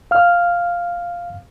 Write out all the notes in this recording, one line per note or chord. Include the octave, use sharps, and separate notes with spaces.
F5 F6